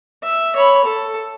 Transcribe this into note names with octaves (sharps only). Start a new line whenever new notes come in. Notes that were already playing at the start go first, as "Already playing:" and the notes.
E5
C#5 B5
A4